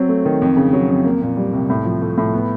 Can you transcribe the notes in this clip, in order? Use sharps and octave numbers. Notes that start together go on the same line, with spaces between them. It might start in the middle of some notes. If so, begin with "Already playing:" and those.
Already playing: F#3 C4
A3
D#3
F2
C#3
F#3
F2
A#3
A#2
G3
C2
A2
F3
A3
A2
B3